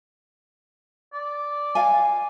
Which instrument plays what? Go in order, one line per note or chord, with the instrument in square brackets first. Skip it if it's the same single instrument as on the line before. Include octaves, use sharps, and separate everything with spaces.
[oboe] D5
[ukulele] F5 G#5